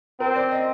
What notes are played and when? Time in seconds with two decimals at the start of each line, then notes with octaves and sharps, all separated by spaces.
0.20 C4 A#4
0.36 D5
0.51 D#5